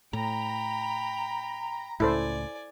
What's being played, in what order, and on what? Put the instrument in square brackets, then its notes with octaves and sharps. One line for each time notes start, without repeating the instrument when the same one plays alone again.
[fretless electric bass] A2 [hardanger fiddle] G5 B5 [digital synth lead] A#5
[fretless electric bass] C#2 A2 [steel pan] E4 A4 C5 [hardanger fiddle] D5 G#5